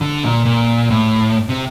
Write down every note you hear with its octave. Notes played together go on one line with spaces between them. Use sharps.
D3
A#2
A#2
A2
C3